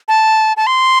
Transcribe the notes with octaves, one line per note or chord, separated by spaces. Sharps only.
A5
A5
C6